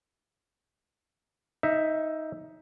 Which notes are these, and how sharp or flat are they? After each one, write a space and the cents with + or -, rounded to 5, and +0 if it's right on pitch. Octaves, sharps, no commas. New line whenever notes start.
D#4 +15 E5 +0